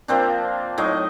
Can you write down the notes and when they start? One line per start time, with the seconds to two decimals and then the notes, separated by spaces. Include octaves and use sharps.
0.08 F3 A#3 C4 D4
0.78 A2 F#3 D#4 D#5